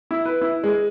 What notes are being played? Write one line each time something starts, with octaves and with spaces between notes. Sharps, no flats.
E4
B4
E4
G#3